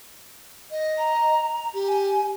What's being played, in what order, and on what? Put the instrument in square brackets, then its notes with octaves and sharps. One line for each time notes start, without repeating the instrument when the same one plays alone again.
[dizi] D#5
[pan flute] A#5
[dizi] G4
[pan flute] G#5